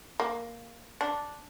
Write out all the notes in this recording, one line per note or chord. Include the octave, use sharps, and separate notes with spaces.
A#3
D4